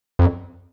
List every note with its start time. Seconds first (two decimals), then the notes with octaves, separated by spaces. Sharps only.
0.19 F2